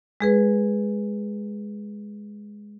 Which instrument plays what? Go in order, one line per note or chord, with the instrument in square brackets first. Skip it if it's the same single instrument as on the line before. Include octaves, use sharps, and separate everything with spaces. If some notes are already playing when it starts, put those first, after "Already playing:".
[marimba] G#3 G#4 B4